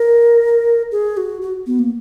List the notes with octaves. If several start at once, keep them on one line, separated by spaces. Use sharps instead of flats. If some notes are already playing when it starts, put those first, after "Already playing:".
Already playing: A#4
G#4
F#4
F#4
B3
A#3